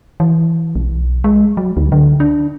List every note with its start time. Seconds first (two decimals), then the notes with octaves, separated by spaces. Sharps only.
0.20 E3
0.76 B1
1.24 G#3
1.57 F#3
1.77 D2
1.92 D3
2.20 D4